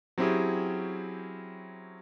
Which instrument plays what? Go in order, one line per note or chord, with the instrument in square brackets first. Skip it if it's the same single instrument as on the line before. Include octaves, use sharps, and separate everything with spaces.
[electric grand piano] F#3 C4 C#4 E4 G4 G#4